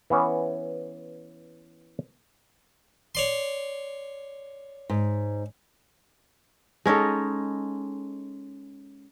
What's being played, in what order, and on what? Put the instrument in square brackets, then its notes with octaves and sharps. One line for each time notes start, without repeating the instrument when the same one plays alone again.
[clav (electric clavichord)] E3 B3 C#4
[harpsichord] C#5 D5 C6
[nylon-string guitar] G#2
[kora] G#3 C#4 D#4 A4